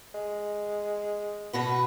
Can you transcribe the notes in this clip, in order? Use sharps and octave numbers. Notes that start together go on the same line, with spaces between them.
G#3
B2 F#4 B4